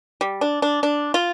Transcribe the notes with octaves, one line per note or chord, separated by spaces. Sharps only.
G3
D4
D4
D4
F4